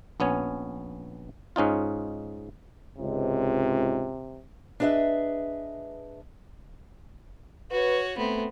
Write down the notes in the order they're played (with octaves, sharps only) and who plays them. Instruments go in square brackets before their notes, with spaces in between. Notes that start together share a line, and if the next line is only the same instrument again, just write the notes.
[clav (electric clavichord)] A#1 B3 C#4 C#5
G#2 C#4 D#4 F4
[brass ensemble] C#2 G#2 [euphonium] C3
[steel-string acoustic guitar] D4 G#4 B4 D#5 E5
[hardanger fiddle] F#4 C#5 [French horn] B4
[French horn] A3 [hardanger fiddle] B3 C4